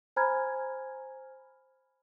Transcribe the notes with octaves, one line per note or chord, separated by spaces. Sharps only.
C5 G#5 A#5 B5 F6 G#6